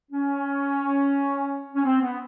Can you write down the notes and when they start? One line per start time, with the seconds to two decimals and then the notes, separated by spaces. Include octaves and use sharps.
0.12 C#4
1.75 C#4
1.85 C4
2.02 B3